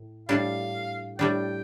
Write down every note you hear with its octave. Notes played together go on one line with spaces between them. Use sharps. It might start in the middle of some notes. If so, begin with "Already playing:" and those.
Already playing: A2
A2 G3 D4 F5
A2 G3 D4 G5